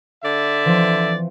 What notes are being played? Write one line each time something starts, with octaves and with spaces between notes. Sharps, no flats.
D3 D5 E5
E3 F3 C4